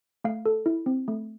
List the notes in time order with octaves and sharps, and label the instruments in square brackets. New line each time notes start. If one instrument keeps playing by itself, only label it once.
[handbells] A3 F5
A4
E4
C4
A3